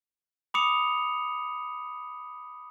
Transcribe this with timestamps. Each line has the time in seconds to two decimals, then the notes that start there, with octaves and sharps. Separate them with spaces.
0.54 B5 D6 D#6 C#7 F7